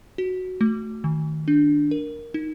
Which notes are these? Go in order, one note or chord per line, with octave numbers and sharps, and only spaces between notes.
F#4
A3
D#3
D4
A#4
D#4